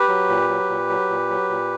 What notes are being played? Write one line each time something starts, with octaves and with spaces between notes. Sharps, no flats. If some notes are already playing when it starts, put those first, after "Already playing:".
Already playing: G4 B4
F#3
A#2
F#3
A#2
F#3
A#2
F#3
A#2